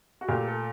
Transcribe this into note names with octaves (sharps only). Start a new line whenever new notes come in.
F#4
A#2 A3 G4
A4